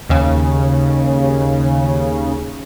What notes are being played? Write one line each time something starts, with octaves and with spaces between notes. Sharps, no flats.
D#2 C#3